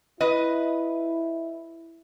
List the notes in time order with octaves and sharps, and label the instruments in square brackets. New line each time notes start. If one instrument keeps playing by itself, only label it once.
[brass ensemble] E4 [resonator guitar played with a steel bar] B4 D#5